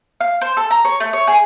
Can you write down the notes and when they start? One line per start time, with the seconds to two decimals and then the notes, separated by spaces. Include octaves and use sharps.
0.21 F5
0.41 C5
0.57 A4
0.71 A#5
0.85 C#5
1.00 A3
1.13 C#5
1.27 G#4